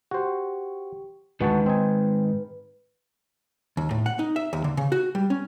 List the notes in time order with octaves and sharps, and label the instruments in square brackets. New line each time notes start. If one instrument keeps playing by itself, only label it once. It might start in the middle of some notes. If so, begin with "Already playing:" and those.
[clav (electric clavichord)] F#4 C5 [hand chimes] G4
[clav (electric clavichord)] D2 F#4 A5 [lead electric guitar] G#2 D#3 [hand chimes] B4
[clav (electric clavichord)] C4 D#4 G#5
[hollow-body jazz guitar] D#2
A2
F#5
D#4
E5
D#2
D3
C#3
F#4
G3
C#4